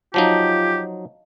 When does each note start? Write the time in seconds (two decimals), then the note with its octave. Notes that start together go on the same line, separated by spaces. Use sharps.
0.14 F3 F#3 D#4 F4 G4 D#5 F5 A5